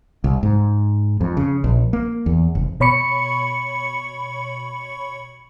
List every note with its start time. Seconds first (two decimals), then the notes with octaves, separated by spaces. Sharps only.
0.24 C2
0.43 G#2
1.21 F2
1.37 C#3
1.64 A#1
1.93 A#3
2.26 E2
2.55 F1
2.80 B2 C#5 B5 C#6 C#7